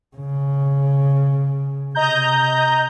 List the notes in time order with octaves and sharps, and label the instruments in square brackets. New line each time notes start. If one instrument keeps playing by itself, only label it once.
[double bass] C#3
[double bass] C3 [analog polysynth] D#5 A#5 G6